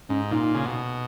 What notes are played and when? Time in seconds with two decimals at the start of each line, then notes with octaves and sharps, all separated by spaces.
0.09 G#2 C#4
0.31 A#2 D#4
0.55 C#3
0.65 B2